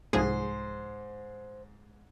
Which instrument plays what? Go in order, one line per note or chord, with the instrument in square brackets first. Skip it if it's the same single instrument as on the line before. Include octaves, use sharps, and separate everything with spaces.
[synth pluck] C2 F3 G#4 [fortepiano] G#2 [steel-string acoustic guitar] C5